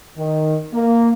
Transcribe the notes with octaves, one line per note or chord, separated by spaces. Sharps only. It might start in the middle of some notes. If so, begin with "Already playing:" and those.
D#3
A#3